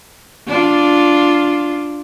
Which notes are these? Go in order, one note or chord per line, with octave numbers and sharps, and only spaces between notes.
D4 F4